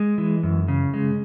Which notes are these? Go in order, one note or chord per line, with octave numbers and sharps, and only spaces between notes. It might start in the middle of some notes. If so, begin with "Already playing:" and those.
Already playing: G#3
E3
F#2
C#3
G#3